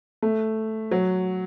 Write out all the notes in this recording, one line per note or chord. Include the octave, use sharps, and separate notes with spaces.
A3
F#3